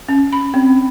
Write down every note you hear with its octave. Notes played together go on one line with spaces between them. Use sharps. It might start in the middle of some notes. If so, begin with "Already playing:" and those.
C#4
B5
C4